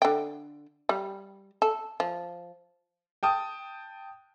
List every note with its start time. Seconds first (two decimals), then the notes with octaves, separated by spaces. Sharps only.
0.02 D3 G5
0.89 G3
1.62 A4
2.00 F3
3.23 G5 A5 D#6